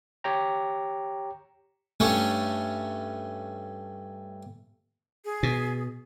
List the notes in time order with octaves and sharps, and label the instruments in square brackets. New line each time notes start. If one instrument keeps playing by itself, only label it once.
[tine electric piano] G4 C#5 G5 A#5
[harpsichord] G2 A3 C#4
[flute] G#4
[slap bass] B2